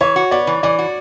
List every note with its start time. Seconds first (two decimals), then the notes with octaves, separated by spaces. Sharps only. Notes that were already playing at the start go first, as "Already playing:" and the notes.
0.01 E3 C#5
0.16 F#4
0.31 B3 D5
0.47 E3
0.63 E3 D5
0.79 F#4